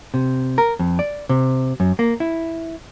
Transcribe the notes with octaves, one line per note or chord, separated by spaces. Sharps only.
C3
A#4
F2
D5
C3
F#2
A#3
E4